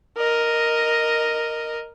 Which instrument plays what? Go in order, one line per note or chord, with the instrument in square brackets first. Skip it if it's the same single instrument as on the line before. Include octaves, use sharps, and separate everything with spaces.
[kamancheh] A#4 D#5